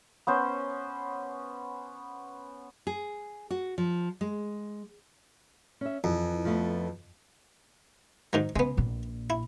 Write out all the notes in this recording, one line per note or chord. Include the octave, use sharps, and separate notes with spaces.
B3 C#4 C5
G#4
F#4
F3
G#3
C#4 E5
F2 E3
F3 A3 B3
G#2 D#3 F#3
C#3 G#3 B3
A#1 A#2
E4